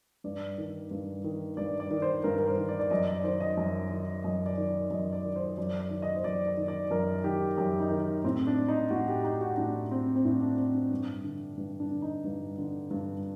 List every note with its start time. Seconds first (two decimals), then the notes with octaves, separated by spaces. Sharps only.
0.24 G2 D5
0.58 D#3
0.91 G2
1.24 D#3
1.57 G2 D5
1.80 D5
1.91 D#3
2.02 C5
2.24 G2 A#4
2.38 A#4
2.46 C5
2.57 D#3
2.69 D5
2.80 D5
2.90 F#2 D#5
3.08 D5
3.24 D#3 C5
3.40 D#5
3.57 F#2
3.91 D#3
4.24 F#2 D#5
4.46 D5
4.58 D#3
4.69 D5
4.90 F#2 D#5
5.12 D5
5.24 D#3
5.36 C5
5.57 F#2 D5
5.80 D5
5.90 D#3
6.02 D#5
6.16 C5
6.24 F#2 D5
6.47 D5
6.57 D#3
6.68 D5
6.91 F#2 A#4
7.24 D#3 G4
7.58 F#2 G4
7.80 D#4
7.90 D#3
8.24 A2 C4
8.47 D4
8.68 D#4
8.90 A2 F#4
9.08 G4
9.24 D#4
9.41 F#4
9.57 A2 D4
9.91 C4
10.15 C4
10.24 A2 D4
10.41 D4
10.57 C4
10.74 D4
10.90 G2
11.24 D3
11.57 G2
11.80 D4
11.91 D3
12.02 D#4
12.24 G2
12.58 D3
12.91 G2